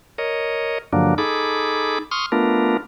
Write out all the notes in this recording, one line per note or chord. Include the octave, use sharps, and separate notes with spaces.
A#4 C#5 D#5
G2 D3 F3 F#3 A#3 D4
D#4 G#4 A4 B5 D6
C6 C#6 D#6 F6
A3 B3 D4 F4 A#4